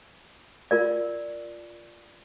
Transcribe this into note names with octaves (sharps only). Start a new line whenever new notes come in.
F4 A#4 D5